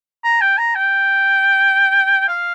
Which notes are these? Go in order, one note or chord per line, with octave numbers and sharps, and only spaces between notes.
A#5
G5
A#5
G5
F5